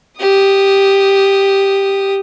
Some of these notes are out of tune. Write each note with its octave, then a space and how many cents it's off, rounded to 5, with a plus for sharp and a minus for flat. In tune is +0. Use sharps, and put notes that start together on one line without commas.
G4 +0 D#6 -10